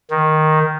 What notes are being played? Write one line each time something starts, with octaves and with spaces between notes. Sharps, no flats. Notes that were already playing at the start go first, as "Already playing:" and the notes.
D#3